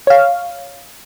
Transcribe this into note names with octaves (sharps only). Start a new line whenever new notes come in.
C#5 F5